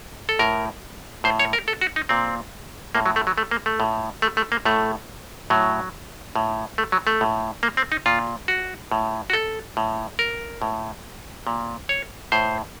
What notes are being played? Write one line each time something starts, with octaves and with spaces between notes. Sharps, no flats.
A4
A2 A#4
A2 C5
C#5
A#4
A4
F#4
D#4
A#2 C4
A2 A#3
F#3
A3
F#3
A3
A#3
A3
A2
A3
A3
A#3
A2 A3
A2 F#3
A2
A3
F#3
A3
A2
A#3
C4
D#4
A#2 F4
F#4
A2
F#4
A4
A2
A#4
A2
A#2
C#5
A2 C5